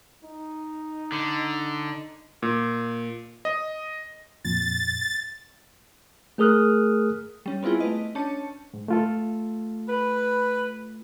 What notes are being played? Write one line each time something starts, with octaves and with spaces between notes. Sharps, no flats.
D#4
D3
A#2
D#5
F2 A#2 A6
A3 G#4 A#4 D#6 F6 F#6
G3 C#4
B3 C4 E4 F4 G#4
A3 B4 D#5
C#4 D4 A5 C#7
G#2
A3 F4 A4
B4